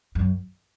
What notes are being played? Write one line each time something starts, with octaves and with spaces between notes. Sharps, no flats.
F#2